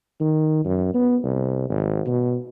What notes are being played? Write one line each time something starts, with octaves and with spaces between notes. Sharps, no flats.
D#3
F#2
B3
C2
G#1
B2